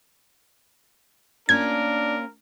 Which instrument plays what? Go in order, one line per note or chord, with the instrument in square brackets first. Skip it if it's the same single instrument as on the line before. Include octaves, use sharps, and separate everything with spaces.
[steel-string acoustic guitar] A#3 C#4 F4 [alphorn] D4 [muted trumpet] A#4 [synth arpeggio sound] G#6